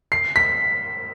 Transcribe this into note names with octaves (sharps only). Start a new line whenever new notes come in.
C7
B6